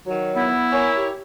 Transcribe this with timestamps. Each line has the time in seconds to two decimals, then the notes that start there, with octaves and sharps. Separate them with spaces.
0.06 D#3 F#3 C#5
0.36 B3 E4
0.72 A#4 C#5 G#5
0.96 G4